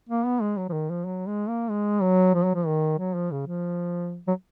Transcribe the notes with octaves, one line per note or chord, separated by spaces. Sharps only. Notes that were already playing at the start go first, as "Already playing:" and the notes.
A#3
B3
G#3
F#3
F3
D#3
F3
F#3
G#3
A#3
G#3
F#3
F3
F#3
F3
D#3
F#3
F3
C#3
F3
F#3